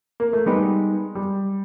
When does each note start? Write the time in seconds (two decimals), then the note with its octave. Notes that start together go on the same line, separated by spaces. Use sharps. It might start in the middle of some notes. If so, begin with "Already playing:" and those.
0.20 A#3
0.33 A3
0.46 G3 G#3 B3 D#4 G4 B4
1.15 G3